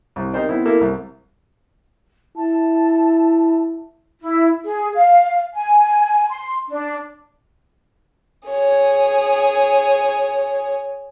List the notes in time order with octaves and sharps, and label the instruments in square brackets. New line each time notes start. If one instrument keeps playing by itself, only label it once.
[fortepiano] C2
C4 D#4 G4 A#4 C5 D5
B3 C4 E4
A#3 E4 A4 A#4
C2
[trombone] E4 [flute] A5
[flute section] E4
G#4
F5
G#5
C6
D4
[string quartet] G#4 C#5